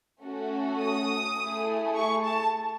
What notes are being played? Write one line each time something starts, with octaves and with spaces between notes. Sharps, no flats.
A3 C#4 F#4 A4
D#6
A3 E4 G#4
C#6
A5